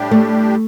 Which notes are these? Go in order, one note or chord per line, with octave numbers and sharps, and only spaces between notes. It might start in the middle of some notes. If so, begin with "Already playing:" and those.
Already playing: A2 G3 D4 G4
A3